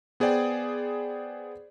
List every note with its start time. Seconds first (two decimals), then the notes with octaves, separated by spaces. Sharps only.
0.20 B3 G#4 C5 D5 G5